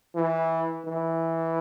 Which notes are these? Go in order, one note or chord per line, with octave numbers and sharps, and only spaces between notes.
E3
E3